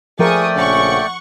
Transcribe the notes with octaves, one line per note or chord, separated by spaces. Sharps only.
F3 A3 G#4 A#4 D5 G5 C#6 D#6
A#1 C#3 C#4 F#5 C#6